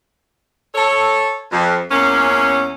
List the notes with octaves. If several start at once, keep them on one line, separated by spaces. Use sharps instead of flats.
A4 C#5
F2
E2 A#3 C#4